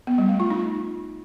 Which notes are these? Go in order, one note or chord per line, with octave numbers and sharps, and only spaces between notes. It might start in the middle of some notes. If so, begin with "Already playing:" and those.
B3
G3
A3
F4
D#4